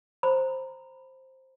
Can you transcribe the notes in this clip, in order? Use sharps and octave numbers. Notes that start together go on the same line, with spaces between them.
C5 A#5 B5